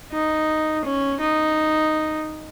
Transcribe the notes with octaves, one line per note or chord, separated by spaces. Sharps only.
D#4
C#4
D#4